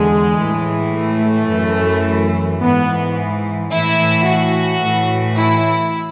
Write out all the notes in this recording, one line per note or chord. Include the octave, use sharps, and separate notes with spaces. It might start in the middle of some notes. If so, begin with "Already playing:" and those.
Already playing: E2 D3 G#3
A2 E3
A3
F#2 E3
G#2 E3 B3
A2 E3 E4
F#4
A2 E3
E4